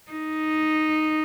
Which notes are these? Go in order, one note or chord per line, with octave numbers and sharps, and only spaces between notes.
D#4